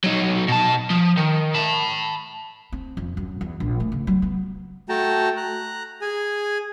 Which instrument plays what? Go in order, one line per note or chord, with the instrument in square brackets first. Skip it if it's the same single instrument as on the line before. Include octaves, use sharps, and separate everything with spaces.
[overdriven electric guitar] F#3 D#4
B2 A5
F3
D#3
A5 B5
[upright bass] C4
F2
F#2
E2
A#1
A3
C#3
F#3
B3
[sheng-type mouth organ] A3 F#4 G5 A5 A#5
A#5 F#6
G#4 G#5